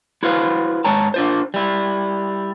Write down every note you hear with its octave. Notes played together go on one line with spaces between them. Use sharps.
E4 F#4 B4 C5 F5
G#2 C#5 A5 A#5
D4 F4 C5
G3 E4